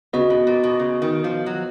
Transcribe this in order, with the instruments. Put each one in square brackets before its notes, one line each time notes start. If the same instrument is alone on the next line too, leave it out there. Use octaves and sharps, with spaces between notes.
[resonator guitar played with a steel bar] C#3 [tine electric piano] B3 F#4 B4 D#5
[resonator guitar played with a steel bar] B2
A#2
B2
C#3
D#3
F3
F#3